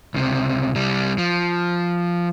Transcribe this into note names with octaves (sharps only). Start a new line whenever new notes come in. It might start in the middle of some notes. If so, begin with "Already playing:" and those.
C#2 C3
C2 G3
F3